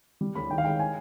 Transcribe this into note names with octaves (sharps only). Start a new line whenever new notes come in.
G3
D2 B5
D#3 G5
F5
G#3 G5
G#5